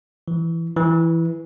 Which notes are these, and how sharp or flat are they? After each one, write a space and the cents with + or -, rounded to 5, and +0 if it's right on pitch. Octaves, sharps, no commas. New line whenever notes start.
E3 +10
E3 +5